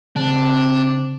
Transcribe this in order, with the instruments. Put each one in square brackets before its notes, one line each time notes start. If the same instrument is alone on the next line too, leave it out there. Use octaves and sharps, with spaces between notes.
[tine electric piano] C#3 [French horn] C4 [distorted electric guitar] D4